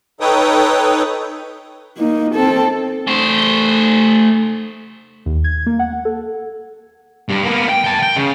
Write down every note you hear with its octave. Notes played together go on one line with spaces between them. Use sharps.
D#4 A4 B4 C#5 G5 D#6
A#3 D#4
C4 A4
A3 C5
D#2
G#6
A#3
F#5
A4
G2
A#3 B3
G5
G5 A5
G5
C#3